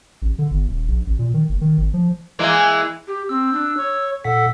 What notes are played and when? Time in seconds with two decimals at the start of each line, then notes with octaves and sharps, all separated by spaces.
0.22 A1
0.38 D3
0.51 G1
0.68 D#1
0.88 A#1
1.07 A1
1.19 A#2
1.34 D#3
1.49 F#1
1.61 D#3
1.78 G#1
1.94 F3
2.39 E3 G#3 A#3
3.07 G4
3.29 C4 E6
3.53 D4
3.77 C#5
4.24 A#2 A4 F#5 B6